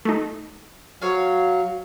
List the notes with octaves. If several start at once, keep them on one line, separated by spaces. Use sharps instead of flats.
A3 D#4
F#3 C#5 F5